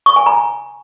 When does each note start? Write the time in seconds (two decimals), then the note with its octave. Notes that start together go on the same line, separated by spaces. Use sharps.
0.06 C#6
0.16 G#5
0.26 A#5